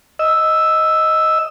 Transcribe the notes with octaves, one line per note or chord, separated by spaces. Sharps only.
D#5 E6